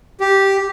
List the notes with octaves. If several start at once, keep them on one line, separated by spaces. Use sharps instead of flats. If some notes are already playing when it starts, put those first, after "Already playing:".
G4